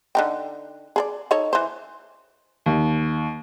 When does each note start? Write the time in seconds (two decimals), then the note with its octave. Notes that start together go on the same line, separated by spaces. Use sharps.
0.15 D3 D#4 G5
0.96 G#4 A4 D5
1.31 D#4 A4 C#5
1.53 E3 C5
2.66 D#2